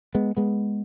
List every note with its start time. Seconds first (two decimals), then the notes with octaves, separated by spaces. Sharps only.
0.15 G#3 B3
0.37 G#3 B3